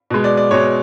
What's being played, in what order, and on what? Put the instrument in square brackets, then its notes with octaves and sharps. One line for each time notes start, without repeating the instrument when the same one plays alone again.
[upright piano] B2 G#3
D5
D5
B2 G#3 C#5